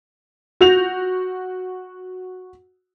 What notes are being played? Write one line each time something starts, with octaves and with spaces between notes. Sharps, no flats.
F#4 G6 A#6 F7